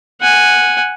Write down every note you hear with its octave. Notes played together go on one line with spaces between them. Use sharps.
F#5 G#5